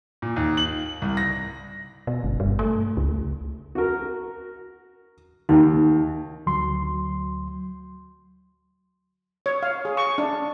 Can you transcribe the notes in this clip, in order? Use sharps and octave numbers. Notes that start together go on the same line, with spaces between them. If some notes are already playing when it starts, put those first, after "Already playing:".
A#2
D#2
F#7
C2
A#6
B2
G1
G2
A3
C#2
F#4 A#4
D#2 D#4
D2 F#3 C6
C#5
F5
G#4
C#6
D4